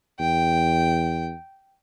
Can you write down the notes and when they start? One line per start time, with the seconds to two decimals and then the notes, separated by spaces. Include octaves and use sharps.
0.20 E2 G5